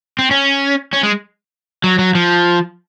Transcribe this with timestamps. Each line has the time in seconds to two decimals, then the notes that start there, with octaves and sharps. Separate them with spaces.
0.19 C4
0.31 C#4
0.93 C#4
1.03 G#3
1.84 F#3
1.99 F#3
2.15 F3